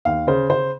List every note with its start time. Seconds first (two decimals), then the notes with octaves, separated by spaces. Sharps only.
0.05 D#2 F5
0.27 C#3 C5
0.50 C#3 C5